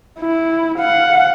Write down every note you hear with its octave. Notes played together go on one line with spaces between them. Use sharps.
E4
F5 F#5